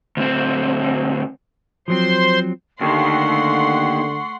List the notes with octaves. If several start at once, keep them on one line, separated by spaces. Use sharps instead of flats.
D2 C4
F3 F#3 C4 C5 C6
D#2 D3 D#3 A3 F#5 C6 C#6